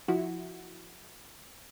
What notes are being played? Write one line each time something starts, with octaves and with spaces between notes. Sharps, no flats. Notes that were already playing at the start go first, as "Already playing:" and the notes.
F3 E4 F#4